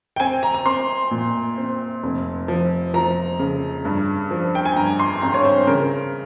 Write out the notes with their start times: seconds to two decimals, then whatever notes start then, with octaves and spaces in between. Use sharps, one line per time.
0.16 G5
0.20 C4 G#5
0.43 A#5
0.54 A#5
0.66 C4 C6
1.11 A#2
1.58 C4
2.03 F1
2.48 F3
2.94 F3 A#5
3.39 C#3
3.85 G2
4.31 F3
4.55 G5
4.65 G#5
4.76 G2 A#5
5.00 C6
5.21 G#1 A#5
5.34 C#5
5.45 C5
5.67 C#3 A#4